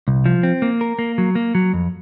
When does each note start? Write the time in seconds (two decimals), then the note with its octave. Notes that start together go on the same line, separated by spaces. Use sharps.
0.08 C2
0.26 F3
0.43 C4
0.62 A#3
0.81 A#4
0.99 A#3
1.18 F#3
1.35 A#3
1.55 F#3
1.73 F2